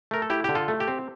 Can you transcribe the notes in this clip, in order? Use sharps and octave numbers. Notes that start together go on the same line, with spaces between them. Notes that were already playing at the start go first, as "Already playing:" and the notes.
A3 A#4
A4
E4 G4
D3 G4
F4 A4
A3
G4
C4